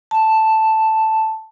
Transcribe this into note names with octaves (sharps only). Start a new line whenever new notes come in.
A5